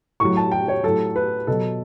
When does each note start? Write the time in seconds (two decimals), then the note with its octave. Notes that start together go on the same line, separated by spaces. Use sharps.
0.20 A2 F#3 C#6
0.37 A5
0.52 G5
0.68 C#5
0.83 A2 F#3 A4
1.16 B4
1.47 B2 F#3 A4